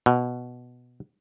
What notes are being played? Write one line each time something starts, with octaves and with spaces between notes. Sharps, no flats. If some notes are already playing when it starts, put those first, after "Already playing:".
B2